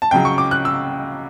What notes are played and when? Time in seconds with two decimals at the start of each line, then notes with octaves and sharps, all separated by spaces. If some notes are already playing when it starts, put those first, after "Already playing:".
0.02 A5
0.11 C#2 C#3 F#3 G5
0.25 C#6
0.38 D6
0.51 F#6
0.65 E6